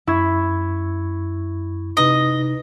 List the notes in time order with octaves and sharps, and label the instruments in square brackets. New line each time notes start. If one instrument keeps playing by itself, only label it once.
[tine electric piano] F#2 C#6 G#6 [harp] E4
[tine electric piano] C3 D#4 B4 [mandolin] D#5